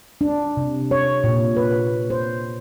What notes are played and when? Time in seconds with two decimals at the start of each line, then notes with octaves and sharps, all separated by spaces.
0.21 D4
0.57 C3
0.91 C#5
1.24 A#2
1.57 B4
2.10 C5